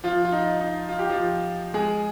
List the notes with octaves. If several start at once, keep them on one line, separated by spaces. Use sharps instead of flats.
F3 F4
F4
D#4
D#4
F4
G4
F3 F4
G#3 G#4